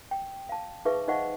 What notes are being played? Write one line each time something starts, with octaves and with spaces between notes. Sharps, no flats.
G5
F5 A5
D#4 G#4 B4 E5 F5 C#6
D#4 C5 D#5 F5 F#5 C#6